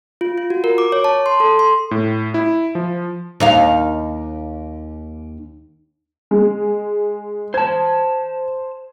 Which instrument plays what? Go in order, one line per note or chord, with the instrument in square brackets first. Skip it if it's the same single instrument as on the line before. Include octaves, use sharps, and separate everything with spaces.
[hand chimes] F4
F4
F#4
A#4
D6
C#5
A5
C6
A4
C6
[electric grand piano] A2
E4
F3
[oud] D#2 D#4 F5
[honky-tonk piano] G#3
[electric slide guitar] C5 A5 [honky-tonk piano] G#6